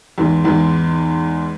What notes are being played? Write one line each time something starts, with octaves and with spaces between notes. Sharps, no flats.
E2 G#2
E2 G#2